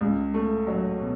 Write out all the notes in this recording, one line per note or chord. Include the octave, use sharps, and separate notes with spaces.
C#2
A3
F#3
B2